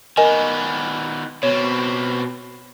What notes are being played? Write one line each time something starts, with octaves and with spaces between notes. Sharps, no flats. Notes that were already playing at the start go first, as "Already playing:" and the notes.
D#3 B3 A#4 D#5 G#5
B2 C4 C#5